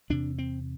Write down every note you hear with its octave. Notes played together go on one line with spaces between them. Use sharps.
E2 C3 D4
C4